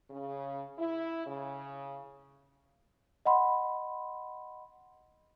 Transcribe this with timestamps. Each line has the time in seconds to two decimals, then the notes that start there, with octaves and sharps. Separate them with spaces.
0.10 C#3
0.78 E4
1.26 C#3
3.26 D#5 F#5 B5 C6